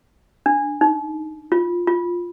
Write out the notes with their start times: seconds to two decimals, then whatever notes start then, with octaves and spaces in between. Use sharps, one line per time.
0.46 D4
0.81 D#4
1.52 F4
1.87 F4